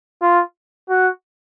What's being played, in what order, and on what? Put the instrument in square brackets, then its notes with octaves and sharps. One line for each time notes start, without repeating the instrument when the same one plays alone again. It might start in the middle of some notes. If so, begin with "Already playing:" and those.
[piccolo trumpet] F4
F#4